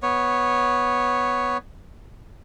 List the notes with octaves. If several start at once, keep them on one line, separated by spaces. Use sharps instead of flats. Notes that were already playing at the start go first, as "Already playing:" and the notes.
B3 C#5